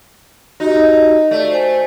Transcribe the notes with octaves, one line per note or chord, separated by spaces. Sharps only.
D#4 F#4 G4
A3 D5
C5 G#5